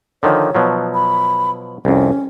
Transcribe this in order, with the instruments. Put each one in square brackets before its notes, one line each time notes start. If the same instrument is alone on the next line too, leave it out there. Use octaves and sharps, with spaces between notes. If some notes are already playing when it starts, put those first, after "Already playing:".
[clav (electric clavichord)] D3 D#3 F3 [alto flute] C#5
[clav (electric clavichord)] B2 F3 F#3
[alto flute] B5
[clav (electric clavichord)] C2 F2 [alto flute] C#4